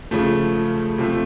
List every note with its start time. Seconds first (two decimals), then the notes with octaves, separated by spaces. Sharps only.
0.11 C#3 F3 A3
0.98 C3 F3 A3